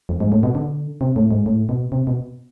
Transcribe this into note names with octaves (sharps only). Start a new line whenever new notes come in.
F2
G#2
A2
B2
D3
C3
A2
G#2
A2
B2
C3
B2